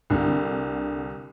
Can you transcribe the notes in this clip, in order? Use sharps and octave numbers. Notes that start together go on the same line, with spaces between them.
C2 D3